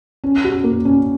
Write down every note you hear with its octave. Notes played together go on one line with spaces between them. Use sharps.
C#4
F#4
A#3
C#4